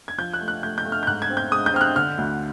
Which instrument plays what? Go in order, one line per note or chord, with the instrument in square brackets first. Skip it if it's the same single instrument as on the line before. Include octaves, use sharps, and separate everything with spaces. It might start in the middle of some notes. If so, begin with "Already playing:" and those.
[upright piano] G#6
F3 G6
F#6
A3
F#6
A3 G6
G6
A3
F6
G6
G#2 F#6
G#6
C4
G6
G#3 D#6
G6
C4 F6
F#6
D3 F6
D2